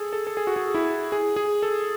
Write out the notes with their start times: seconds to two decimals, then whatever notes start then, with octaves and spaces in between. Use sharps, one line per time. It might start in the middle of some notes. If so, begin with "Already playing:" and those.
Already playing: G#4 A4
0.13 A4
0.27 A4
0.37 G#4
0.47 F#4
0.56 G#4
0.74 E4
1.12 G#4
1.36 G#4
1.62 A4